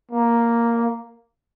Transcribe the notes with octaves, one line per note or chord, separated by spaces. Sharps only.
A#3